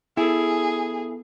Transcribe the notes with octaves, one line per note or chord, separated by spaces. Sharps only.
B3 E4 G#4 A4